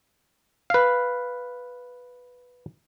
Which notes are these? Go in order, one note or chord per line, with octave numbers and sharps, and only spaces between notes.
B4 F5